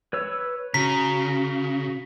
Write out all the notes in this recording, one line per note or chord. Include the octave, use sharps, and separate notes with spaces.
B4 C#5 E6
C#3 F#4 A#5 B6